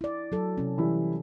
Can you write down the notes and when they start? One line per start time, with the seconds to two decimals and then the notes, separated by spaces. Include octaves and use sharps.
0.01 E4 D5
0.32 F#3 A4
0.58 C3 C#4
0.78 E3 G3 E4